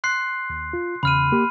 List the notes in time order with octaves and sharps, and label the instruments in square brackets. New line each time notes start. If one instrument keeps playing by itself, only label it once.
[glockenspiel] C6 F#6 C7
[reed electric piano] D#2
F4
[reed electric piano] E2 C#3 [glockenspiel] B5 F6 D#7
[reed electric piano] A#3 G4